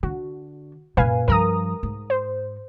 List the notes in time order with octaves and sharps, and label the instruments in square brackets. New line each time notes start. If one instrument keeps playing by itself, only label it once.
[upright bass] D3 [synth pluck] F#4
[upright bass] F#2 A#2 [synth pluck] B4 F5 G#5
[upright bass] G2 F3 [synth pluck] A#4 A#5 D#6
[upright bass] G#2
[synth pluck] C5